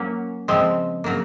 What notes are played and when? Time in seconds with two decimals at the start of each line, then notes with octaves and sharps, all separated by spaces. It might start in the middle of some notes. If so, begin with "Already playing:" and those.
Already playing: F#3 A#3 C#4
0.48 C#3 F3 G#3 C4
1.04 C#3 F#3 A#3